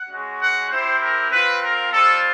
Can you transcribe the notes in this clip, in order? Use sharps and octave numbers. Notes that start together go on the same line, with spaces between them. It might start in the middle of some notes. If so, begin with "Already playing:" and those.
Already playing: F#5
G#3 C#4 F#4
F#5
C4 E4 G4 C5
A#4
C4 F4 B4
A#4
G3 C4 F4 A4